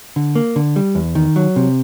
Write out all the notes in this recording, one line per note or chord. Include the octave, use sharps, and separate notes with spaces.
D3
A#3
D3
G3
E2
D#3
F#3
C3